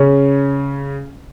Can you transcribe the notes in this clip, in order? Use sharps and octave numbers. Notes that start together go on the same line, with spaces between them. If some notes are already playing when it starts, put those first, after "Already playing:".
Already playing: C#3 C#4